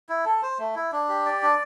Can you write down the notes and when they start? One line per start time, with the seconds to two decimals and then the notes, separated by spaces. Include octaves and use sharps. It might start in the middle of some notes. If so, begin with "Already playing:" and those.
0.09 E4
0.25 A4
0.42 C5
0.59 A3
0.75 E4
0.92 D4
1.09 G4
1.26 D5
1.42 D4